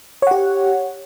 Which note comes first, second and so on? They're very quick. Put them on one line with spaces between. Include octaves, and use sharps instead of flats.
C#5 F#5 G4